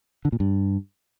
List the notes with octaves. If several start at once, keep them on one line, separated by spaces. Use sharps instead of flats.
D3
A#2
G2